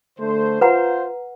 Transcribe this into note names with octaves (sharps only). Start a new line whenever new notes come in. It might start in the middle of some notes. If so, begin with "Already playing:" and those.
D3 A3 C5
F4 B4 C5 F#5 A#5